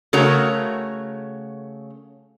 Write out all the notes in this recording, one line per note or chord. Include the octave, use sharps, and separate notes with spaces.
C#3 A3 F#4 A#4 C#5 A#5